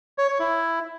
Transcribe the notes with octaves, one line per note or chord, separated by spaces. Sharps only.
C#5
C#5
E4